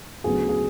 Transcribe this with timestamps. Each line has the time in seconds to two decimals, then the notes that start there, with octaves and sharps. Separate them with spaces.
0.24 D2 C#3 F#3 B3 G#4
0.49 G#4